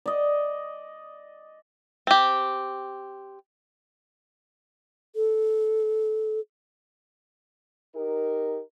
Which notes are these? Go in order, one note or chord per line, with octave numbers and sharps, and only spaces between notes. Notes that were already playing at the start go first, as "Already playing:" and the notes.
D5 D#5
C4 G4
A4
D#4 G4 A#4